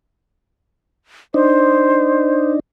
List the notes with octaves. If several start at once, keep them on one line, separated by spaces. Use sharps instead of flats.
D4 D#4 C5